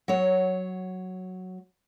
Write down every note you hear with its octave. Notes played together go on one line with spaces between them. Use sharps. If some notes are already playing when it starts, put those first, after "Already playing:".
F#3 C#5